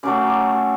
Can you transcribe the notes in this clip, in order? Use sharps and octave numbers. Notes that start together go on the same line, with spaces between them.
C#3 F#3 A3 D6
D6
C#6